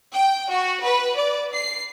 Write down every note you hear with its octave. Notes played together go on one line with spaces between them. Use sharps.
G5
F#4
B4
D5
C7